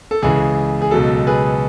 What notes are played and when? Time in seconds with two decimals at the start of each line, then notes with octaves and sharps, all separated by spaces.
0.11 A4
0.22 C#2 C#3 E3 G#4
0.82 G#4
0.91 C#2 B2 F#3 A4
1.27 G#4 B4